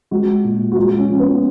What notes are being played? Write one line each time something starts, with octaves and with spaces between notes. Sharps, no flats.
G#3 F#4
A#2
F#4
G#3 F4
C#4
F3
B3